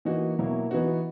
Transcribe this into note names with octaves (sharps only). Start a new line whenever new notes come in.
E3 A#3 D#4 F#4
B2 F#3 A#3 E4
E3 B3 D#4 F#4